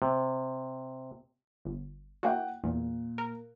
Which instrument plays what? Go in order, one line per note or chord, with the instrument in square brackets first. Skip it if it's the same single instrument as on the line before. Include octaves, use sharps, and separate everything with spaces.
[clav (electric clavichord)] C3
[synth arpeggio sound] G1
[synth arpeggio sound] A#3 E4 F#4 [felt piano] F#5 G5
[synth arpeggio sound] E2 [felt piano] A#2
[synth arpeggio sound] A#4